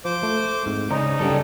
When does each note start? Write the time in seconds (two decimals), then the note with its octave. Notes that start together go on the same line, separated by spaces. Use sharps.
0.05 F3 C5 D6
0.23 A3
0.66 G#2 C4
0.91 C#3 D#4 C5 D5 A#5
1.20 G2 C#3 D4 G4 A4